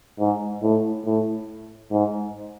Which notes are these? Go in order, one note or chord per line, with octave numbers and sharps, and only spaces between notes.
G#2
A2
A2
G#2